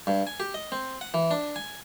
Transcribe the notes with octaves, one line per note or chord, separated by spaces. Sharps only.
G2
G#5
G4
D#5
C4
F#5
E3
D4
G#5